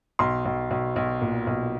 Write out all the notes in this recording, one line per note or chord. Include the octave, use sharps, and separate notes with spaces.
B1 C6
B1
B1
B1
A#2
B1